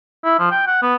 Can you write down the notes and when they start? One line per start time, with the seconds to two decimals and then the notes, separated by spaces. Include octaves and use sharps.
0.24 E4
0.39 F3
0.51 G5
0.67 F#5
0.82 B3